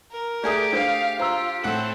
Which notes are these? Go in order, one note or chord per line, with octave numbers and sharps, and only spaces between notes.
A#4
A3 G4 G#4 D5 D#6
D4 C5 F5
F4 C5 A#5 E6
A2 C4 A4 F#5 F#7